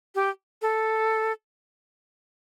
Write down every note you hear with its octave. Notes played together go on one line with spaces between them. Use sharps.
G4
A4